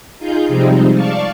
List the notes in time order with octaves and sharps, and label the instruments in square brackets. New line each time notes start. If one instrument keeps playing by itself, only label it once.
[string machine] D#4 F4 G#4 G6
C3 F3 G3 G#3 C4 D#4
D5 F5 A5 C#6